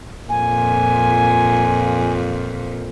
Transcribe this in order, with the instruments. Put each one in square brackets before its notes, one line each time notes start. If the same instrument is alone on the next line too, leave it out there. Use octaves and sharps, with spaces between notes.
[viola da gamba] F2 A#2 [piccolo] G#5